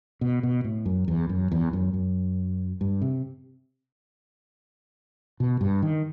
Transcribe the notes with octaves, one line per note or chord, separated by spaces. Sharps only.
B2
B2
A2
F#2
E2
F#2
E2
F#2
F#2
G2
C3
B2
G2
D#3